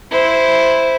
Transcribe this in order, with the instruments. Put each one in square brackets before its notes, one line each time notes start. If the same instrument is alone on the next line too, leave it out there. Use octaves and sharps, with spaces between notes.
[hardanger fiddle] E4 C5